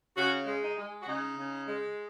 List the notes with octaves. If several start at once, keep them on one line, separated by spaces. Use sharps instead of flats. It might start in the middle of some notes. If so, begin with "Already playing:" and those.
C#3 F#4
G#3
D#4
G#3
F#4
C#3 D#4
C#3
G#3